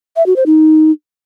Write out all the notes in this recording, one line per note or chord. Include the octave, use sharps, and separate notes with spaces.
E5
F#4
C5
D#4